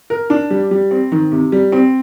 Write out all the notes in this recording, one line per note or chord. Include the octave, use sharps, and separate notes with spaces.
A#4
D4
G3
G3
C4
D#3
C3
G3
C4